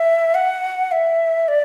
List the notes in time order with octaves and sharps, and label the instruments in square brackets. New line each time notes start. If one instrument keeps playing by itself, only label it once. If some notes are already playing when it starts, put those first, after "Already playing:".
Already playing: [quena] E5
F#5
E5
D5